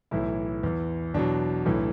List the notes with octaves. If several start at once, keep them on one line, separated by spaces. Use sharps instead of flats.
B1 A2 E3 E4
E2 E3
E2 B2 F#3 D4
B1 A2 E3